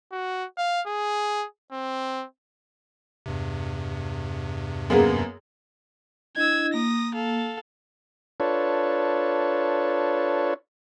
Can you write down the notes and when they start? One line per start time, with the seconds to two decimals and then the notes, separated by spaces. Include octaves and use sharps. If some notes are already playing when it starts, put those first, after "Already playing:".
0.12 F#4
0.58 F5
0.87 G#4
1.72 C4
3.26 E2 G2 C3
4.90 F#2 A#3 B3 G#4 A#4
6.36 D4 E4 D#5 E6 G#6
6.74 A#3 D#6 A#6
7.14 A4 F5
8.40 D4 F4 A4 B4 C#5